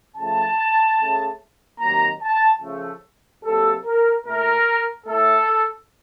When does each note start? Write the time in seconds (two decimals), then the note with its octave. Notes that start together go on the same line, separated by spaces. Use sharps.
0.17 C#3 F3 A3 A5
0.98 C#3 A3
1.80 C3 D#3 F#3 A#3 A#5
2.21 A5
2.61 C#3 F3 A3
3.44 C3 F#3 A#3 A4
3.84 A#4
4.25 A#2 A3 A#4
5.06 A2 A3 A4